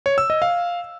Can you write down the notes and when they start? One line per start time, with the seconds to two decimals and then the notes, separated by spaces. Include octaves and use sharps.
0.06 C#5
0.18 E6
0.30 D#5
0.42 F5